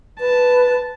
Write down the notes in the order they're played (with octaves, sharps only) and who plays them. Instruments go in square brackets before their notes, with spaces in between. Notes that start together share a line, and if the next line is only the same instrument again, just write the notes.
[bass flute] B4 [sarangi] A5